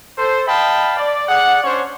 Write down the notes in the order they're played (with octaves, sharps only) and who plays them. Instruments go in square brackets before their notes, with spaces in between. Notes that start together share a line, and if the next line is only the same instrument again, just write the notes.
[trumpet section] A4 C5
D#5 F5 G5 A5 B5
D5
G#4 D5 F#5
C#4 D4 C5 C#5